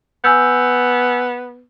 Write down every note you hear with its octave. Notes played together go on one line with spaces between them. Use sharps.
B3 G#5 E6 G6